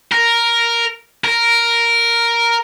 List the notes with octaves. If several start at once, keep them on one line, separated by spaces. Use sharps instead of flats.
A#4
A#4